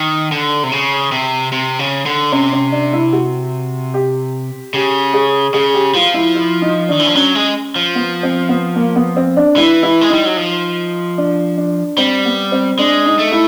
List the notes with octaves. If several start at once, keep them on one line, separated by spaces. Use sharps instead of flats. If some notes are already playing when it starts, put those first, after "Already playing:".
Already playing: D#3
D3
C3
C#3
C3
C3
C#3
D3
C3 C#4
C#4
D4
E4
F#4
G4
C#3 G4
G#4
C#3 G#4
G4
F3 F4
E4
E4
D#4
D#3 D4
E3
F3
F#3 C#4
G#3
F3
B3
C4
B3
A#3
B3
C4
D4
E3 E4
E4
G#3
G3 D#4
F#3
F3
D4
D4
G3 C4
B3
C4
G#3 D4
D#4
A3
E4